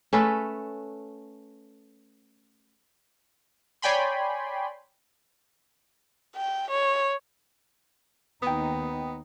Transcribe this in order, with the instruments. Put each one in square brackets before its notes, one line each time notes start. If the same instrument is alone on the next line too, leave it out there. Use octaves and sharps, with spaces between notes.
[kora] A3 C#4 A4 B4
[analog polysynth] C#5 D5 G5 G#5 B5 C6
[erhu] G5
C#5
[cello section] D#2 D#4 [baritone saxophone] B3 [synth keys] G5 D#6